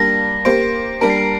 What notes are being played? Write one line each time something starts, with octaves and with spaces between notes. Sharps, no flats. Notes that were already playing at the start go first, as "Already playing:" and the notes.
Already playing: G3 A#3 D4 A#6
A#3 G4 C5 D7
G3 A#3 D4 A#4 D7
C7
D7